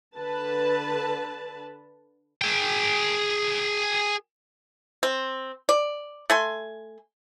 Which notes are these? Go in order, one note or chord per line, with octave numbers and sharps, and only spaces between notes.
D3 B4 A5
G#4 G5
C4
D5
A3 G#5 C6